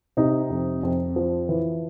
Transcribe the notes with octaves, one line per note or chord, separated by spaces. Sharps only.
C3 D#4
F2
F2
F3
E3